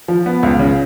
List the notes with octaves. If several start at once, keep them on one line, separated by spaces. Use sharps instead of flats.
F3
B3
C#2
C#3